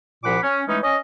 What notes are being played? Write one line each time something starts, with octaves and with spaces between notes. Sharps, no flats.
C2 A#2 F3 F#5 B5 D6
C#4
E3 G#3 A3 C#4 D#4
C#4 D#5